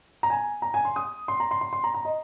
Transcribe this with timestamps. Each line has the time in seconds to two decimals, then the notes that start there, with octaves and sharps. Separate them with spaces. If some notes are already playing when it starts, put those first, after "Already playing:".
0.23 A#5
0.30 G#5
0.62 A#5
0.74 G#5
0.85 C6
0.96 D#6
1.28 C6
1.40 A#5
1.51 C6
1.61 C6
1.73 C6
1.84 A#5
1.94 A#5
2.05 D#5